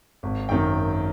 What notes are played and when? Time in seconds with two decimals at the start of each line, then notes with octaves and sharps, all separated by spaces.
0.23 G#1
0.49 F#2 D#3 G5